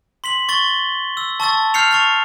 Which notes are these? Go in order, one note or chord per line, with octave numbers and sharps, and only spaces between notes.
C6 B6 F#7
C#6 A6 G7
E6
A5 C#6 E6 A6
F6 G6 C7 C#7 F7
C#6 A6 F7